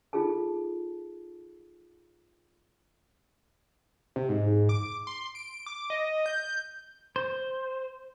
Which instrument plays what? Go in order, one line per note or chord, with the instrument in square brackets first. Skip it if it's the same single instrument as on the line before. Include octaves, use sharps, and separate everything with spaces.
[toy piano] D#4 F4 G#4 A4 A5
[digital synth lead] C3
G#2
D6
C6
D7
D6
D#5
G6
[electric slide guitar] C5